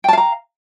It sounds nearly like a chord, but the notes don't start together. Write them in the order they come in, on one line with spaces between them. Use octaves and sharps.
G5 A5 F5 A#5